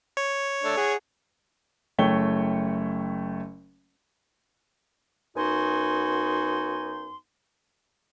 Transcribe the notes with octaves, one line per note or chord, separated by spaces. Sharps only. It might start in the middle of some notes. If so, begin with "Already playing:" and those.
C#5
A3 D4
G#4 F#5
F#1 A3 C#5 G5 G7
F#2 B3 D#4 F#4 G#5 C6